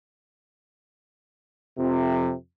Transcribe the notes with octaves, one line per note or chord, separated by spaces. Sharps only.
F2 C3